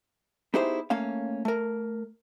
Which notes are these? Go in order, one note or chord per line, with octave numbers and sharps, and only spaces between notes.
B3 D#4 E4 G4 G#4 C5
A3 A#3 C#4 F5
A3 A#4